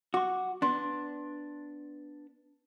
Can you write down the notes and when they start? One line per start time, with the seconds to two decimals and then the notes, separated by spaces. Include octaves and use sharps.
0.14 F#4 C#6 D6
0.62 B3 D4 C6